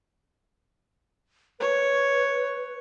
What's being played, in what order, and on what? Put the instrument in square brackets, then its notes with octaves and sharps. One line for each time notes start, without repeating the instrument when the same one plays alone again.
[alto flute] B4 [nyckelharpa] C#5